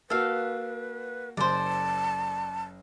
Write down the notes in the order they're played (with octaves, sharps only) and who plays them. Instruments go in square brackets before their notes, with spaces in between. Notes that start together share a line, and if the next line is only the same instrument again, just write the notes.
[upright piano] A#3 F#4 [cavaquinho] A4 F5 [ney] B4
[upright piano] F#1 [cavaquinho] C5 D5 [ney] A5